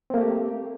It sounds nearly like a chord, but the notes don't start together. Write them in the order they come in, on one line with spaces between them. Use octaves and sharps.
C4 A#3 A3 G4